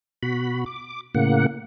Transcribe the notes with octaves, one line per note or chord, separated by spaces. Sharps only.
B2 F#4 B5
D6
A2 C#3 A#3 F#5